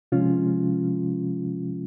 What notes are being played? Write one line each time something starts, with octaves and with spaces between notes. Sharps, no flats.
C3 F3 G#3 C#4 F4